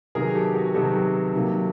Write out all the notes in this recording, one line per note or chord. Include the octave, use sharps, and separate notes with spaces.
C3 D#3 F#3 B3 G#4 A#4
G4 A4
F#4 G#4
C3 D#3 F#3 B3 G4 A4
C3 D#3 F#3 A#3